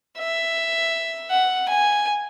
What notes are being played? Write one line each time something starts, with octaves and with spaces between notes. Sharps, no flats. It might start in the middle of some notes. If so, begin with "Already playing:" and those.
E5
F#5
G#5